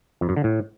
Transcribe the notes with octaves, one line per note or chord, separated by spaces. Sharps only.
F2
F#2
D3
A2